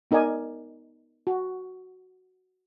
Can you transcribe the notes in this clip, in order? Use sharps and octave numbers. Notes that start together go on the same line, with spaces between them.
B3 D#4 A#4 D5 G#5
F#4